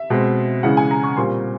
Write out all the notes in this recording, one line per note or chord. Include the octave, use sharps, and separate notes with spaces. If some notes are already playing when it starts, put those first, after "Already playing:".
Already playing: E5
B2 G#3 C4
C#3 E3 G#3 F#5
G#5
A#5
C#6
A#2 G3 C4 C6